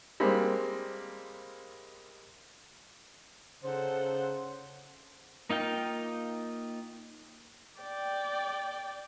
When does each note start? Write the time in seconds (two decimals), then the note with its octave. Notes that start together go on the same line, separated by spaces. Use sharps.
0.20 G3 G#3 A#3 C4
3.64 C#3 D#4 A4 C5 F#5
5.49 A#3 D#4 F4 G5
7.80 D5 G5